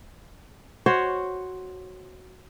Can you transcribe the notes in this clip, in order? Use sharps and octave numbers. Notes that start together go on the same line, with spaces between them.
F#4 C5 C#5